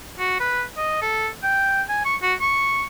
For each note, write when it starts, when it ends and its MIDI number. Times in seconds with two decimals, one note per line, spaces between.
0.19 0.36 66
0.40 0.63 71
0.77 1.01 75
1.02 1.28 69
1.43 1.82 79
1.89 2.03 80
2.05 2.16 85
2.22 2.33 66
2.41 2.84 85